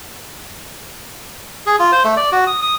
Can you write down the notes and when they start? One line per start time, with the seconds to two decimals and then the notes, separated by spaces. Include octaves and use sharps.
1.66 G#4
1.79 F4
1.92 C5
2.04 A3
2.17 D5
2.32 F#4
2.47 D#6
2.62 D#6